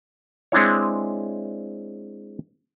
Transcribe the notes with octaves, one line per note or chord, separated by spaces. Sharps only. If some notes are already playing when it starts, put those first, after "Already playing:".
G#3 C4 D4 E4 C#5